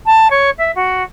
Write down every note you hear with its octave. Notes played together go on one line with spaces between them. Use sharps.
A5
C#5
E5
F#4